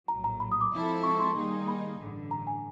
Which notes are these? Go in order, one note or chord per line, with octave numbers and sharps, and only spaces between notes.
A#1 A2 F#3 A#5
A#5
B5
D#6
D6
F3 G#3 C4 E4 A4
C#6
C6
D#3 G3 A#3 D#4 G#4
B5
A1 G2 D3
A#5
G#5